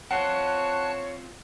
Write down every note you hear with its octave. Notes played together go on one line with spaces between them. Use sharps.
C4 F4 C#5 F#5 A5 F#6